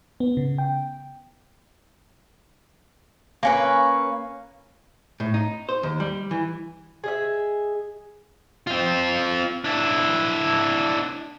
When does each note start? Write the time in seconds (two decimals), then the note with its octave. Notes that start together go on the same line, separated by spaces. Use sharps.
0.20 B3
0.37 C#3
0.58 G5
3.43 A#3 C#4 B4
5.20 A2
5.34 D#4
5.69 C5
5.83 D#2
6.00 G3
6.31 E3
7.04 G#4 D#5 E5
8.67 C4 F4
9.64 D4 E4